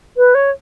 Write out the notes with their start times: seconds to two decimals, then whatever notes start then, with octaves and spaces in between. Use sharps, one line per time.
0.17 B4
0.35 C#5